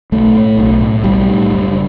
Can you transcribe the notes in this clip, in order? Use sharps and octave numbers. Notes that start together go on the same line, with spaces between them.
B1 A3
A2
B1
A2
B1 G3
A2
F#1